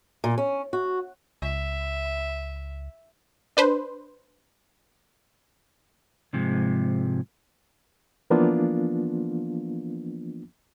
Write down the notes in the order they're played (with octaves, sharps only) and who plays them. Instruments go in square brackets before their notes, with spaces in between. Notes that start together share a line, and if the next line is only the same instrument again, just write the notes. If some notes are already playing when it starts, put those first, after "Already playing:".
[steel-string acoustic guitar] A#2
C#4
F#4
[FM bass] C#2 [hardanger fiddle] E5
[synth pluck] D4 B4 C5
[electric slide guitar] G#2 C3 F3 G#3
[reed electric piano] E3 F3 A#3 B3 D4 F4